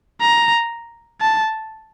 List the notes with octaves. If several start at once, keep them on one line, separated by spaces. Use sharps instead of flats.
A#5
A5